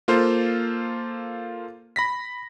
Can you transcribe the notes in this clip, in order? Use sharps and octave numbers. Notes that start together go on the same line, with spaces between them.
A#3 F4 A4 C5 F5
B5 A#6 B6